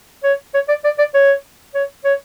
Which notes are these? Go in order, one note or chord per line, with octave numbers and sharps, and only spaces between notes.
C#5
C#5
D5
D5
D5
C#5
C#5
C#5